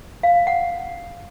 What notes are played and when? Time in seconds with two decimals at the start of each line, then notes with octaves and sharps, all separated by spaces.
0.23 F5
0.47 F#5